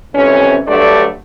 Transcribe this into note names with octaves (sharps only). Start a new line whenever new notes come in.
F2 G#2 C3 E3 C#4
G2 D3 F#3 G3 A3 D5